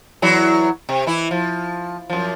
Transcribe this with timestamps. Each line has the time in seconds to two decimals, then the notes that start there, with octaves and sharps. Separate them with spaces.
0.22 E2 F#3 E4
0.89 C3
1.07 E3 E4
1.31 F3
2.10 F#2 F3